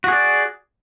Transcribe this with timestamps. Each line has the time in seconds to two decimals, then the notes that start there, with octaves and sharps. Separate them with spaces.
0.04 F#4
0.08 G#4
0.12 D5